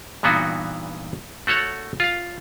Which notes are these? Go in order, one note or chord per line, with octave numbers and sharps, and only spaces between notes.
G2 A#2 E3 B3 D#4 F#4
A3 F#4 A4 C#5 F#5
F4 F5